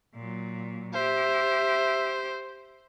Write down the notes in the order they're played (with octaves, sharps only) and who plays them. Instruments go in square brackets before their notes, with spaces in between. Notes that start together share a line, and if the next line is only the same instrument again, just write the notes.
[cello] A#2 F#3
[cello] G4 [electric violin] C5 [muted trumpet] E5